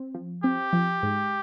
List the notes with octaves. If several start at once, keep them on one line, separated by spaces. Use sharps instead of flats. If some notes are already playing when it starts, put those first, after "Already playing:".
Already playing: C4
F3
C4 G4
F3
G#2